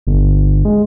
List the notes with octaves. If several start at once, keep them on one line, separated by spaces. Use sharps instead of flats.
G1
G#3